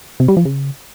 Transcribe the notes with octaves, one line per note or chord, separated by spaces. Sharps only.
C3
G3
F3
C#3